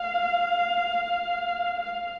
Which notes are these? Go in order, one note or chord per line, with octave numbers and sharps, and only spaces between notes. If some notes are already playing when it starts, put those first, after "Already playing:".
Already playing: F5
F5